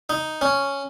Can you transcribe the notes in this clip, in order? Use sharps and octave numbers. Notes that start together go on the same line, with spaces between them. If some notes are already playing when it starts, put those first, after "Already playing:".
D#4
C#4